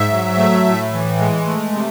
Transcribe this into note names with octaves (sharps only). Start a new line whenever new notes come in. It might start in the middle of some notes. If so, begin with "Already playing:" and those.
Already playing: G#2 E5
F#3
A3
A2
E3
G#3
A3
C3